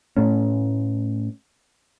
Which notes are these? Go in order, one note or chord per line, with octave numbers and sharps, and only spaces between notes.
A2 A3 C#4